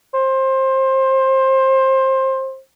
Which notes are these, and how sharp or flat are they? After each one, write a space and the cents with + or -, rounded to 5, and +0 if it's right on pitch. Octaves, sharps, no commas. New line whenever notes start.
C5 +20